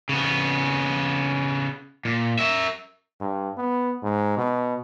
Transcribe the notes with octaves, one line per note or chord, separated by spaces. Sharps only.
C#3 B3
A#2
A#4 E5
G2
B3
G#2
B2